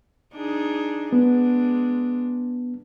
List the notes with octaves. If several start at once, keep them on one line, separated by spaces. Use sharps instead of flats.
D4 D#4 G#4
G#3 B3 D4